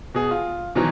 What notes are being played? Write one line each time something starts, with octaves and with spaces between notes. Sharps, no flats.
B2 G#4
F4
B2 D#3 E3 F#3